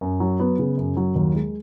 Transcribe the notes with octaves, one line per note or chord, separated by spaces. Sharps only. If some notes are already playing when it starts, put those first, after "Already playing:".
F#2
F#3
B3
C#3
F#2
F#3
D#2
G#3